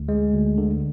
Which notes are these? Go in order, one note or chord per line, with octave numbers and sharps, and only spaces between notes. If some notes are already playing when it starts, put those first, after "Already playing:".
Already playing: D2
G#3
D2
D3